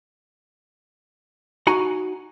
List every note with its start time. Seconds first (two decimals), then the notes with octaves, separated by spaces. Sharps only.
1.67 D#4 F#4 G#5 A#5